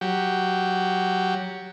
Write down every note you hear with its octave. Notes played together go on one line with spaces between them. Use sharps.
F#3 G4